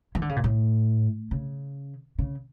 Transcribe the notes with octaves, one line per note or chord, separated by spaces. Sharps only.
E3
D3
C#3
A#2
A2
C#3
C#3